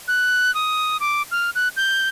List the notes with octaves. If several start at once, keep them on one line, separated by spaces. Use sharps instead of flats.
F#6
D#6
D6
F6
F#6
G6